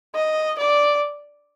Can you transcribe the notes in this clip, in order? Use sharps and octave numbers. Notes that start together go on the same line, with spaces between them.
D#5
D5